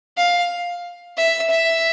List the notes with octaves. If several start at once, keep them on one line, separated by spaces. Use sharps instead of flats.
F5
E5
E5